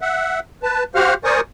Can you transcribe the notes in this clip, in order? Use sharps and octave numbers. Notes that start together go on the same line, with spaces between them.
E5 F#5
B4 A5
F#4 G4 C5 F5 F#5 F6
A#4 C5 D5 G#5 C#6 D#6